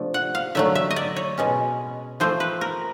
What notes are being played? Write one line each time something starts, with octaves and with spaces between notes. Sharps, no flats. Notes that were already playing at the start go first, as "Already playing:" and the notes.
Already playing: C3 F3 A3 D4
F#5
F5
D3 F#3 A3 E5
E5
D#5
D5
C#5
B2 G#3 C#4
F3 A3 C4 C5
B4
A#4